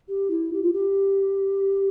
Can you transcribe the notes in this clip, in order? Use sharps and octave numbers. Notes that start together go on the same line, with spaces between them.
G4
E4
G4
F4
G4